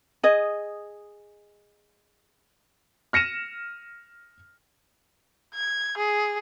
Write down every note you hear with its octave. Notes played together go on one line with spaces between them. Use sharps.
G#4 D#5
F6 A#6 C#7 D#7 E7
G#6
G#4